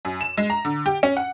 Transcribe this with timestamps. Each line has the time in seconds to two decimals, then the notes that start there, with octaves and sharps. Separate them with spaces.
0.05 F#2
0.21 E7
0.37 G#3
0.50 A#5
0.65 D3
0.86 G4
1.03 C#4
1.17 F#5